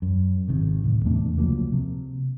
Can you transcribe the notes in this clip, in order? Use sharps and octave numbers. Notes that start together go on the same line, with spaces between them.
F#2
G#1 C3 D#3
D1 A2
E2 C3 A3 D4
C#2 F3 F#3 A#3
C3